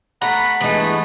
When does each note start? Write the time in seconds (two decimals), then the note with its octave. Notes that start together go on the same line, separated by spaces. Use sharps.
0.22 A3 F#5 A#5 B5
0.61 G2 E3 G#3 A3 B3 D#4